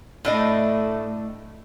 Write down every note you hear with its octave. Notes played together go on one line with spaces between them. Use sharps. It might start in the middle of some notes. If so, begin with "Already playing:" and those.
A2 A3 D4 D#5